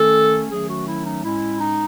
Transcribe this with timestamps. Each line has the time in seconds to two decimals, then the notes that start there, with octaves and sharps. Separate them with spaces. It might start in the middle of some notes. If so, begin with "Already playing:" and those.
Already playing: D#3 A3 C#4 A4
0.51 D#3 F#3 A3 C#4 G#4
0.70 F#4
0.88 E4
1.06 D#4
1.24 A2 G#3 C#4 E4
1.61 D#4